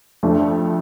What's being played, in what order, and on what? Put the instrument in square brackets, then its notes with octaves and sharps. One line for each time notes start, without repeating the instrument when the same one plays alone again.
[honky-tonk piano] F2 F3 A3 D4